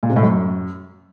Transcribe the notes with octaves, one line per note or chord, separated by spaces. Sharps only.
A#2
C3
A2
F#2